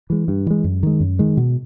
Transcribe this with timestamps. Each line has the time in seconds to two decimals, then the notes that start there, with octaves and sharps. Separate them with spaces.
0.10 E3 G#3
0.28 G2
0.47 E3 G#3
0.64 F#2
0.83 D#3 G#3
1.00 F#2
1.19 D#3 G#3
1.37 B2